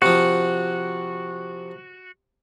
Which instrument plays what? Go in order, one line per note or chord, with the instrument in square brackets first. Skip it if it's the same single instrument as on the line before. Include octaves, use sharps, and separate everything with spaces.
[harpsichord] C3 F3 [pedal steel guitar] F#4